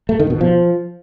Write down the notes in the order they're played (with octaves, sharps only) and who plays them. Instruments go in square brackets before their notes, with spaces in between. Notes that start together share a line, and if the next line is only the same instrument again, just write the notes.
[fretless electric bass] A3
D#3
B2
F3